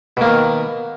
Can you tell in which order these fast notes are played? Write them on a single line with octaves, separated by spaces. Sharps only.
B2 A#3 D#3